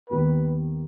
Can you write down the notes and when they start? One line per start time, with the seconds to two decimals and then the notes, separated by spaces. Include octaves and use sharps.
0.09 D#2 D#3 G3 B3 B4